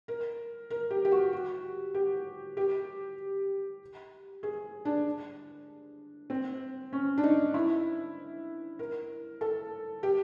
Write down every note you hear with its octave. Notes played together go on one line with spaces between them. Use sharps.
A#4
A#4
G4
G4
F#4
F#4
G4
G4
G#4
D4
C4
C#4
D4
D#4
E4
A#4
A4
G4